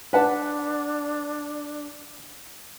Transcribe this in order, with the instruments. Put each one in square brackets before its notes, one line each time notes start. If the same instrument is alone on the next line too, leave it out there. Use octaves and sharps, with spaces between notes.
[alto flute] D4 [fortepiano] B4 F#5 A5